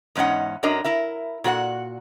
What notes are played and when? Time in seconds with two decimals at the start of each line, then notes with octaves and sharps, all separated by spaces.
0.15 E2 G#2 C#4 D#4 F#5
0.63 F#2 F#3 D4 A#4 D#5
0.84 E4 A#4 E5
1.44 A#2 F#4 B4 F#5